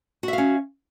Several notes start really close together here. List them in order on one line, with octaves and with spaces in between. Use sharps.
F#4 E5 F5 C#4